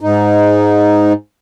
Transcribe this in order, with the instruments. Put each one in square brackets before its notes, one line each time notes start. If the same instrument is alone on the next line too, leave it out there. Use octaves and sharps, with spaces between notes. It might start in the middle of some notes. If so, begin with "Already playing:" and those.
[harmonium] G#2 D#4